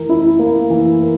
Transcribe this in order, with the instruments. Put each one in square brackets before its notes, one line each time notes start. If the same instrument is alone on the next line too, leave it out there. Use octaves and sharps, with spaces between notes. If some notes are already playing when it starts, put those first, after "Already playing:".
Already playing: [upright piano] E3 A#4
E4
A#3
E3
A#4